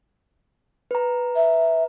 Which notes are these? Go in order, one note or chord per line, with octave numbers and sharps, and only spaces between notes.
B4 A#5
E5